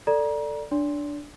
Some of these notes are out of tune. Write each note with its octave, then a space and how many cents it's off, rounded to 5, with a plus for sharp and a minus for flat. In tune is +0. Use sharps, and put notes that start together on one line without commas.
A4 +15 D5 +0 A#5 +30
D4 +0 D5 -40 C6 +0